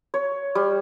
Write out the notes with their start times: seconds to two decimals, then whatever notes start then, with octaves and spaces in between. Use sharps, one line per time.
0.14 C#5
0.55 G3